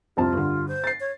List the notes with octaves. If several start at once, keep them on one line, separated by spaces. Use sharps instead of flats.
C2 F2 F4 A5
G2 D3
C5
A6 C7
C#5